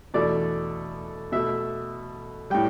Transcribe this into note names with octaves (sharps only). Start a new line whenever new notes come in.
E2 B2 A3 D5
B2 A3 E5
A2 G3 G5